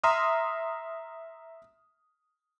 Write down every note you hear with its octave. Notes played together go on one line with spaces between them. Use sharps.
E5 A#5 C6 D#6 F6